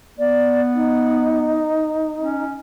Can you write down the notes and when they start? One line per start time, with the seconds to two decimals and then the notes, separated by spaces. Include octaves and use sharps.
0.18 B3 D5
0.75 D#4
2.21 C#4